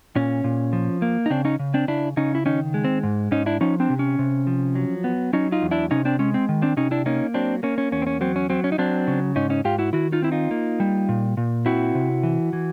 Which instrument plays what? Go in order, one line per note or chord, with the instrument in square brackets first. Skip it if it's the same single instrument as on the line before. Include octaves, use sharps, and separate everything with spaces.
[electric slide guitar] A#2 C#4
A#2
F3
A#3
D#4
C#3 C4 D4
C#4 D#4
C#3
C4 D4
C#3 D4 E4
C#3 C#4 D#4
E4
D#3 C#4 D#4
G#3
C4
G#2
G#2 C#4 D#4
D4 E4
F3 C#4 D#4
C4 D4
C3
C#4
C3
F3
F#3
B3
F#3 C#4 D#4
D#4 F4
E2
D4 E4
C3 C#4 D#4
C4 D4
G#3 C#4
C4
D#3
C4 D4
C3 C#4 D#4
D4 E4
A#3 C#4 D#4
F#3 C4 D4
A#3 C#4
C#4
E2 C#4
C4
C#4
F#3 C4
C#4
F#3 C4
C#4
D#4
F#3 C4 D4
C#3
G#2 C#4 D#4
C#4 D#4
G#2 F4 G4
E4 F#4
D#3 E4 F#4
D#4 F4
C4 E4
D#4 F4
A#3
G3
A#2
A#2
C4 E4 F#4
C3
E3
E3